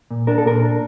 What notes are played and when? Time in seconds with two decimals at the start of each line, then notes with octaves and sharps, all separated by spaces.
0.11 A#2
0.27 D4 A#4
0.38 A4
0.45 A#2 A#4
0.63 D4